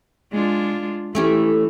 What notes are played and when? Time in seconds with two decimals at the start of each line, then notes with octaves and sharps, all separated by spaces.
0.32 G#3 D4 F4
1.15 E3 A3 C#4 G4